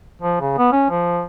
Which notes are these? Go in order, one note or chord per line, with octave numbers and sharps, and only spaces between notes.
F3
C#3
B3
C#4
F3